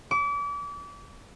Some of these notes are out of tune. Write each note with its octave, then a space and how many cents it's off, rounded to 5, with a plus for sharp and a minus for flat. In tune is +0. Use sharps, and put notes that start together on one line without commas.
D6 -35